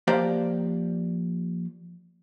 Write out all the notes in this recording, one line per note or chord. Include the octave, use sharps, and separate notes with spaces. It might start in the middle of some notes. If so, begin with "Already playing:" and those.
F3 A#3 G4 C5 D5 F5